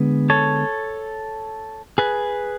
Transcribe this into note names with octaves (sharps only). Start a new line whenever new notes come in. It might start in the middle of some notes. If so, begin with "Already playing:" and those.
Already playing: D3 G#3 B3
A4 C#5
G#4 B4